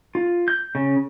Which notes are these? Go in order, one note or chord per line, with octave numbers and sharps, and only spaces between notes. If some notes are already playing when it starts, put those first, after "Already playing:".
F4
G6
C#3